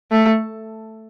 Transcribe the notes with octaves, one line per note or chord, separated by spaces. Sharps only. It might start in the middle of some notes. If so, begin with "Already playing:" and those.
A3